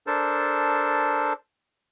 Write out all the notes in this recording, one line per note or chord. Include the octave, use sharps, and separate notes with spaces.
D4 A4 A#4 C5 A5